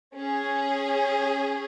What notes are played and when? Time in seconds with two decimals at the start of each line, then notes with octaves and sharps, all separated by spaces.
0.14 C#4 G#4